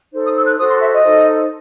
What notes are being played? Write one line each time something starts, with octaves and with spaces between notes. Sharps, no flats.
D#4 A4 C5
D#6
E6
F#6
F#4 A4 C5 D#6
C6
E5
D#5
D#4 A4 C5